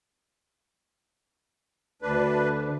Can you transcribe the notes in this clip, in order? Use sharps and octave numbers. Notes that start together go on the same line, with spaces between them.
D2 D4 B4